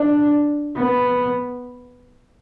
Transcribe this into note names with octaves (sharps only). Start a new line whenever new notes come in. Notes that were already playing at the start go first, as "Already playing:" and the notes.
Already playing: D4
B3